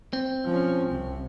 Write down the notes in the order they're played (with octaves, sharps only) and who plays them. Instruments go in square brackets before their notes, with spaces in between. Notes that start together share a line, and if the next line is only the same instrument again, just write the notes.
[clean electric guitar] C4
[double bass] F3 C#4
C2 C3